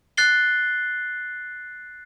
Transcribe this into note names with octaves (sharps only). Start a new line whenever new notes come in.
F#6 A6 C7 G7